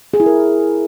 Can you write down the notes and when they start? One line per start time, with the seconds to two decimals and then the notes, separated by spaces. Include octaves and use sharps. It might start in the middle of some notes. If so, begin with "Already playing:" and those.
0.14 G#4
0.20 E4
0.26 A#4